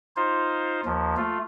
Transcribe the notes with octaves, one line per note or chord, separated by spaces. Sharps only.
D#4 F4 C5
D#2 F3
A3 F4